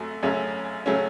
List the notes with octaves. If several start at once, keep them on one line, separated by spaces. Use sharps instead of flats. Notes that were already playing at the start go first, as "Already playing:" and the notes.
Already playing: F#2 F#3 A3
F#2 C#3 F#3 A3 C#4
C#3 F#3 A3 C#4